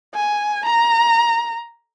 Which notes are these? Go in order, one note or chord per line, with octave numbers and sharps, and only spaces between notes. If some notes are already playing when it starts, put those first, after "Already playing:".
G#5
A#5